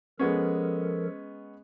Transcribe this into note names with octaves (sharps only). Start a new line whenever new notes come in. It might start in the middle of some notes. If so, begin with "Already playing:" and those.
F3 G#3 B3 C#4 A4 A#4